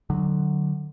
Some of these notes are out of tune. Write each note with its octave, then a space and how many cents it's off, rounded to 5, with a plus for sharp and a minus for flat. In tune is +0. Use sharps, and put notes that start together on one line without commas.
D3 +20 F#3 +0